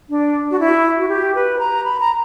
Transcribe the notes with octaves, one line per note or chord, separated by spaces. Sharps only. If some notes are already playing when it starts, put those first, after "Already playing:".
D4
F#4
E4
F#4
G4
B4
A#5
B5
A#5